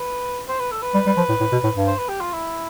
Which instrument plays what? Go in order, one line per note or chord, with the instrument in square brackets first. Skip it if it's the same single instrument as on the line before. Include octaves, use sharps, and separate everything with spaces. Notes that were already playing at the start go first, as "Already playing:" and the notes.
Already playing: [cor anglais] B4
C5
B4
A4
B4
[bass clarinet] G3
G3
F3
A2
A2
B2
A2
G2
[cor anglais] C5
B4
G4
F4
E4